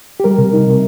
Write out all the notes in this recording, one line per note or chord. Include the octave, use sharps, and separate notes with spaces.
G4
G3 A#4
C3
D#4
C3